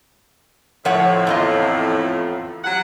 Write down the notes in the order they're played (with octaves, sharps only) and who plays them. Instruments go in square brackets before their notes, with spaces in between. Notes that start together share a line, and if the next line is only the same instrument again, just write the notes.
[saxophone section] F2 A2 [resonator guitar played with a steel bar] F3 C#5 F#5
[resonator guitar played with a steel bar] E2 F4 D#5
[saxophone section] C3 F#3 F#5